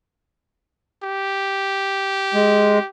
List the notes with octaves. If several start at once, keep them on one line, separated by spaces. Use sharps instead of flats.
G4
G#3